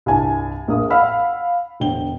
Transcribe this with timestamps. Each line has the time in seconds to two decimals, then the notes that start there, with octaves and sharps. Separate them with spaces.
0.06 C2 G2 G#5 A5
0.68 A#1 A#3 D#6
0.90 F5 F#5 B5 E6 F6
1.80 E1 D3 G5 G7